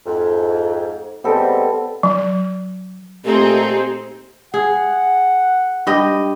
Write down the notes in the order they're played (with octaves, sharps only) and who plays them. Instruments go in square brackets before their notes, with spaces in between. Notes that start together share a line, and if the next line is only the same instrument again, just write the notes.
[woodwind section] F2 G#2
[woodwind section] G#2 G3 C4 [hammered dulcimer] B3 A4
[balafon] F#3
[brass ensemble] A#2 A3 [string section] C4 D#4 G#4 [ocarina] G4
[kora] G#4 [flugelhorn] F#5
[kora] G2 G4 D#5